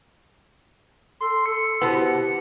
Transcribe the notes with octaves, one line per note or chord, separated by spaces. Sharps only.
A4 C6
A4 C#7
B2 B3 E4 G4 B4 C5